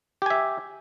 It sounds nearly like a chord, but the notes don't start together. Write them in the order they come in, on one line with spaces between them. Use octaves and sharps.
G4 G#5 E5